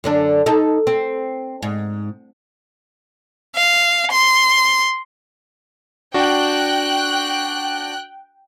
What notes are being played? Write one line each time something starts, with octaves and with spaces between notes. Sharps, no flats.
F#2 D3 D4
D#4 A4
C4
G#2
F5
C6
D4 F#4 G5 F#6